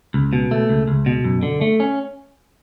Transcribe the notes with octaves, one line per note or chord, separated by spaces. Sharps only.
C#2
B2
A3
C#2
C#2
B2
F#2
D3
A3
C#4